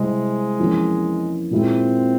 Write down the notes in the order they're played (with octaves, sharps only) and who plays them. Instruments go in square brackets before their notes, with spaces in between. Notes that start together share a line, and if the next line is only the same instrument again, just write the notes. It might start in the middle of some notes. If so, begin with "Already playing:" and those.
Already playing: [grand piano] C3 G3 C4 E4 [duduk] G#3
[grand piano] F2 E3 A#3 C#4
[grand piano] A#2 G#3 E4 [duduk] C4